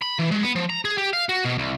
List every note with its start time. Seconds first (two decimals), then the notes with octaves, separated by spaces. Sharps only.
0.02 B5
0.19 E3
0.31 G#3
0.42 B3
0.55 F3
0.70 A#5
0.85 G#4
0.98 G4
1.13 F5
1.29 F#4
1.45 B2
1.58 C2